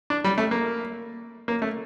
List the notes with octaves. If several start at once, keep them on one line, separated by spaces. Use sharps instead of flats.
D4
G3
A3
A#3
A#3
A3